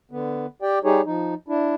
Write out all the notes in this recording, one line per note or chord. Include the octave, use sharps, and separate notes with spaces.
D3 B3
G4 D5 G5
G3 D#4 G4 G#4 C#5
F3 D#4
D4 E4